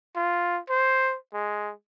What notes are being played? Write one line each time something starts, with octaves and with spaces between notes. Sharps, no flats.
F4
C5
G#3